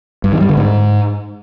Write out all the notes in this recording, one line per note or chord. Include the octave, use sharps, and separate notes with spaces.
G2
D#3
G3
D3
G#2